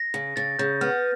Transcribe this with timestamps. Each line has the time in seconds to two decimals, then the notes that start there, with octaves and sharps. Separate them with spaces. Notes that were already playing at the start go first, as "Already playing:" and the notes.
Already playing: A#6
0.14 C#3
0.36 C#3 A6
0.59 C#3 G6
0.81 B3 F6